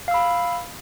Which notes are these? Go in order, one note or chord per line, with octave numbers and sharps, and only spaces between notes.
F5 B5 E6